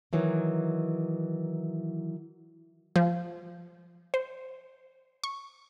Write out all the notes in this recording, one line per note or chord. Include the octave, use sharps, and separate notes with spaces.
D#3 E3 F#3
F3
C5
C#6